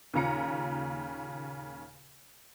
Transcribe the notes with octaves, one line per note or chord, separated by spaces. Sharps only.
D#2 A#2 C#3 A#5 C#7